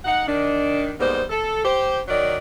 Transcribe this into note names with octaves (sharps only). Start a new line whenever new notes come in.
D#4 F#5
D#3 D4
G#2 G3 A#3 B3 C5
A4
G4 C5
D#3 F#3 D5